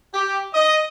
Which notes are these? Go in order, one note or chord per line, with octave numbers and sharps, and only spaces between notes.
G4
D#5